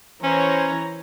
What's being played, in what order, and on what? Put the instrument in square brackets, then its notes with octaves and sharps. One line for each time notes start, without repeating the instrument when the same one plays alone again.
[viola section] E3 C#5 A#5 [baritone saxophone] C#4 [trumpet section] C5